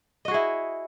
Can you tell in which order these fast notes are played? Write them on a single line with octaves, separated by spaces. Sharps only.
D#5 F#4 G#4 E4